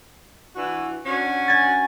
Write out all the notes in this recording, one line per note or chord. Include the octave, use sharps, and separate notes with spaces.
E3 D4 F#4
C#4 D4 F#4
G#5 A6